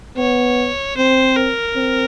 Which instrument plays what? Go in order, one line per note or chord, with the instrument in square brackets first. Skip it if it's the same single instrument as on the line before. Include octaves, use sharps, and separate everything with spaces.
[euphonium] B3 [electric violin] C#5
[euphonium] C4 [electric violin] C5
[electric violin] A#4
[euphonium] C4